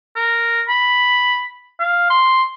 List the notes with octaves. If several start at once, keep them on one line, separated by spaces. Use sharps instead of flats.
A#4
B5
F5
C6